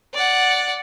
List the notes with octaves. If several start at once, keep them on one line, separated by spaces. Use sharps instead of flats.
D5 F#5